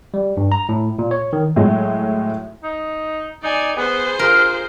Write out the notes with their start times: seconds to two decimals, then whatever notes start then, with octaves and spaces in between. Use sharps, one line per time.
0.14 G3
0.37 G2
0.52 A#5
0.69 A2
0.99 A#2
1.11 C#5
1.33 D#3
1.56 A2 F#3 G#3
2.63 D#4
3.43 D#4 D5 G#5
3.77 B3 G#4 C5
4.19 F4 A#4